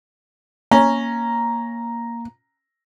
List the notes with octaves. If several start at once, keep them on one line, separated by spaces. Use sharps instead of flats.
A#3 C#4 A#5